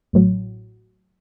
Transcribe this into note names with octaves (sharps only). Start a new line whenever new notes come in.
A1 A2 F#3